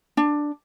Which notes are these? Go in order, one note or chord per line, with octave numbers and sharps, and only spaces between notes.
D4